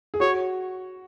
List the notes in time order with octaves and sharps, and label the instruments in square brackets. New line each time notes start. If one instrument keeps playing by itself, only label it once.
[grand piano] G#4
[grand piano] F#4 [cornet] C#5